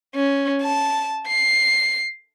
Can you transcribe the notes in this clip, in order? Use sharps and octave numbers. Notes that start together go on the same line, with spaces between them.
C#4
A5
C7